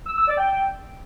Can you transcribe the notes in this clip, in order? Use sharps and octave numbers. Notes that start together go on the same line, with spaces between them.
E6
E6
D5
G5